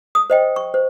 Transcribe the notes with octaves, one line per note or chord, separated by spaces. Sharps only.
D#6
C5 D#5 G5
C#6
C5